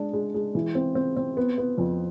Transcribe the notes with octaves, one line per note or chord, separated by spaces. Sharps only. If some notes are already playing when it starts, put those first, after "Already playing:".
Already playing: G#3 D4
G#3
G#3
E3
C4
C4
C4
B3
B3
F2